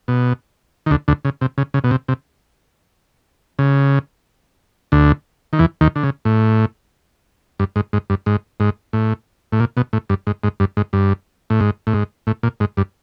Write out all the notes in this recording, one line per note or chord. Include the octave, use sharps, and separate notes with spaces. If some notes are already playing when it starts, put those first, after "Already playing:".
B2
D#3
D2 D3
D2 D3
C#3
C3
C#3
C#3
B2
C3
C3
C#3
D2 D3
D#3
E2 E3
D#2 D#3
D3
C#3
A2
G2
G#2
G#2
G2
G#2
G#2
A2
A2
A#2
B2
A2
G2
G#2
G#2
G2
G#2
G2
A2
G#2
A2
G#2
A2
A#2
G#2
G2